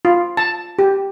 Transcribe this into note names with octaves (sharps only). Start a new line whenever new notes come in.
F4
A5
G4